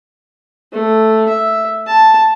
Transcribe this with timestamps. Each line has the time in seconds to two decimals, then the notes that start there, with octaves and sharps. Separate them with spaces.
0.73 A3
1.28 E5
1.87 A5